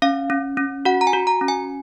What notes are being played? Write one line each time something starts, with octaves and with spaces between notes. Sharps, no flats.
C#4 F5
C#4
C#4
F#4 F#5
A#5
G#5
F#4
A#5
C#4
G#5